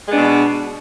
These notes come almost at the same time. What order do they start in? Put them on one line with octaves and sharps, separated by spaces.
G#3 B3 D4 B2